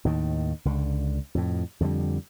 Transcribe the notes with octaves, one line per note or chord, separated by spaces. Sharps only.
D#2 A2 D#3
C#2 D3
F2 A2
F2 D3 F#3 G3